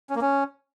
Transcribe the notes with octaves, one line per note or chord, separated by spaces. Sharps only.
C#4
A#3
C#4